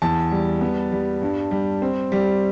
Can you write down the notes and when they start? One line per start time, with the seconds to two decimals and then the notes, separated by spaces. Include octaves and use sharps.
0.02 E2 A5
0.31 G3
0.61 B3
0.92 G3
1.22 G2
1.51 G3
1.82 C4
2.12 G3